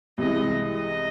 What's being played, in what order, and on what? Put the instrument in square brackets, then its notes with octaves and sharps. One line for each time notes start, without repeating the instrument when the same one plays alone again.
[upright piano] C2 C3 E3 G#3 [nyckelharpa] D#5
[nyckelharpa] D#5